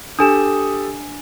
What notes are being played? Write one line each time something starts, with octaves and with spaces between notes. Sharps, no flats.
D4 G4 A4 G#5 D#6 E7